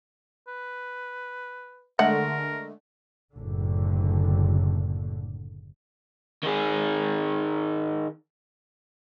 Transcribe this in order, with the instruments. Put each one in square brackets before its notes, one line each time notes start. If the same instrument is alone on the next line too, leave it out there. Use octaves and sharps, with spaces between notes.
[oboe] B4
[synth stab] D3 G#3 A3 [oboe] A#4 [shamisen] F#5
[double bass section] F#1 A2 D3
[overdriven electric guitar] D#3 G#4